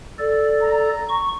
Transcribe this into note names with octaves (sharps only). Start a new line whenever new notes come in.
A4 D5
A#5
C#6